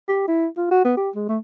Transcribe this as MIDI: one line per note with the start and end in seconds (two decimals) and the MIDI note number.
0.08 0.27 67
0.28 0.46 64
0.57 0.69 65
0.71 0.80 66
0.85 0.96 59
0.97 1.10 67
1.15 1.25 56
1.29 1.38 57